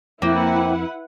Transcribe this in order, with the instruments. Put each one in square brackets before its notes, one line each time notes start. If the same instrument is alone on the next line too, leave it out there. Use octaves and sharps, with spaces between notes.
[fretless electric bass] F2 [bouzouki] A#3 C4 [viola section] E4 B4 F#5